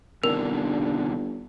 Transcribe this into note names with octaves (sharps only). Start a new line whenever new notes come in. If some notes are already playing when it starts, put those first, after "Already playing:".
G1 C3 D#3 D4 A#4